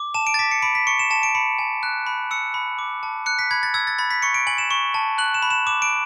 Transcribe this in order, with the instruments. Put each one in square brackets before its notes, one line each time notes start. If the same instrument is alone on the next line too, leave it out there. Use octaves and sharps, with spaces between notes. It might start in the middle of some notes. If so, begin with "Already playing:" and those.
Already playing: [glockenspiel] D6
A5 E7
D7
A6
D6 B6
C#7
B5 D7
B6
C#6 C#7
E7
A5 E7
D7
B5 C#7
G#5
F#6
B5
E6 C#7
B5
D6
A5
F#6 C#7
B6
B5 G#6
A6
E6 G#6
A6
B5 A6
B6
C#6 C#7
D7
G#5 F#7
E7
C#6
A5
F#6 F#7
E7
B5
E7
D6 E7
D7